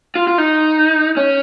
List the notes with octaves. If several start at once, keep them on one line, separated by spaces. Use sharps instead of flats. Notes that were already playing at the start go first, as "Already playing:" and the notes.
F4
F4
D#4
C#4